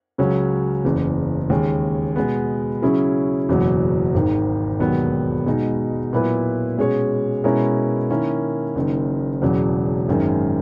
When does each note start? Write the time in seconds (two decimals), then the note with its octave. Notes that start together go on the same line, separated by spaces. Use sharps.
0.18 C#2 C#3 F#3 C#4 G#4
0.84 F#1 E2 C#3
1.50 D#2 C#3 G#3 C#4
2.16 B2 G#3 B3
2.82 C#3 F#3 C#4 E4 G#4
3.49 F#1 E2 B2 F#3
4.14 G#1 G#2 D#3
4.80 E1 D#2 D#3 F#3 B3
5.46 B2 G#3 D#4
6.13 A#2 F#3 B3 E4 B4
6.78 B2 G#3 C#4 G#4 C#5
7.44 B2 G#3 C#4 E4 A#4
8.10 D#3 A#3 C#4 E4
8.75 F#1 F#2 D#3
9.42 E1 E2 C#3 F#3
10.08 G#1 F#2 D#3 G#3